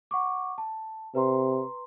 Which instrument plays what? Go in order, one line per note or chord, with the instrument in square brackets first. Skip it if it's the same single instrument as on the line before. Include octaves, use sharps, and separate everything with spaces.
[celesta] F#5 C#6 D6
A5
[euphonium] C3 [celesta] B4 A#5 C6